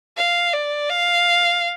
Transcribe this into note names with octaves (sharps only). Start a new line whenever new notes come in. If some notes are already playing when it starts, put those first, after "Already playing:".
F5
D5
F5